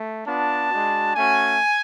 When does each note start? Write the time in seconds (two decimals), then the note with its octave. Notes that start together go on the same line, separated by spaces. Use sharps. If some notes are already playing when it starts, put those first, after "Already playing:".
Already playing: A3
0.25 B3 D4 F4 A5
0.70 G#3 D4 F#4
1.15 A3 C#4 F#4 G#5